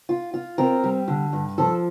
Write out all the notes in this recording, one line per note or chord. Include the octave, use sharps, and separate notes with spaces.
F4
F4
C4 A#4
G3
D3
G2
F3 A4